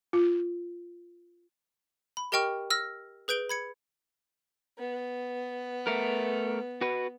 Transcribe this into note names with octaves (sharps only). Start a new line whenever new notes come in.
F4
B5
G4 A#4 D#5 G5 C#6 F6
E6 F6 A#6
G#4 B4 G6 D7 G7
B5 G#6 C#7
B3
A3 A#4
F#4 B4